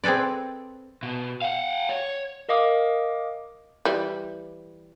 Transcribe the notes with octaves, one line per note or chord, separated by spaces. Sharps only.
C4 G#4 A4 B4 D5
B2
F5 F#5
C#5
A#4 D#5 F5 D6 D#6
E3 G3